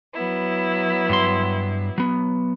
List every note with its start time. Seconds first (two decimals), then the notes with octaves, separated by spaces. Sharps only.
0.13 F#3 B3 E4
1.09 G2 C6
1.98 F#3 B3